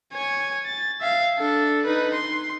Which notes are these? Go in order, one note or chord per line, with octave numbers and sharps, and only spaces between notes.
C#5 G#5
A6
E5 F5
D4 A4
D#4 B4
C6